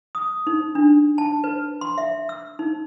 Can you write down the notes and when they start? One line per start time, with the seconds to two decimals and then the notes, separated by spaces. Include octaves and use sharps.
0.15 D#6
0.47 D#4
0.75 D4
1.18 A5
1.44 B4
1.81 C6
1.98 E5
2.29 E6
2.59 D#4